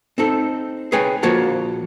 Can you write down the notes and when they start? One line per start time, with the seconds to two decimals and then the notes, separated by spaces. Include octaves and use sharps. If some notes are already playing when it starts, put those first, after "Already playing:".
0.18 C4 D#4 A4
0.92 G#4 B4 C#5 G5 G#5
1.23 A#2 F3 A#3 F#4 C#5 A5